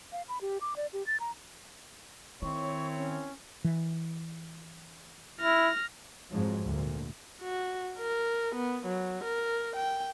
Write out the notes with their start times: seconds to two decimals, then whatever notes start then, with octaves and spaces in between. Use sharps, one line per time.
0.12 F5
0.28 B5
0.41 G4
0.61 D6
0.76 D5
0.93 G4
1.07 A6
1.20 A#5
2.42 D#3 C4 E4 A#4 C#5 C#6
2.97 C#4
3.64 E3
5.41 E4 F6 A#6
6.31 F2 G#2 F3 F#3
6.64 D2 A#2
7.41 F#4
7.99 A#4
8.55 B3
8.86 F#3
9.24 A#4
9.76 G5